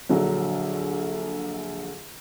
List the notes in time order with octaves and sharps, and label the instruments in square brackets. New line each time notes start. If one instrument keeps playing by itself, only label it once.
[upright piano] A#1 D3 F#3